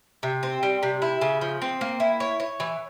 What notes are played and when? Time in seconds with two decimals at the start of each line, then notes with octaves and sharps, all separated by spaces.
0.23 C3
0.43 C4
0.63 G3
0.83 C3
1.02 E4
1.22 C#3
1.41 F3
1.62 C4
1.81 A#3
2.00 E4
2.20 C#5
2.40 C#5
2.60 E3